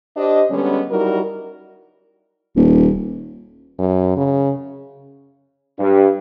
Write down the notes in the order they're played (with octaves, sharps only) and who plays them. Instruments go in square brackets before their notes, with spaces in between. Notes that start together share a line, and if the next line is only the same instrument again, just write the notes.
[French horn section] D4 G4 C5 D#5
D3 G3 G#3 B3 C#4
F#3 G3 D#4 E4 F#4 A#4
[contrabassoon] D#1
[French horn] F#2
C#3
[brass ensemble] G2